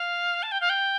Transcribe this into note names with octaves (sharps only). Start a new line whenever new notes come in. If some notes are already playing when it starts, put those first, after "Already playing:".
Already playing: F5
A5
G5
F5
G5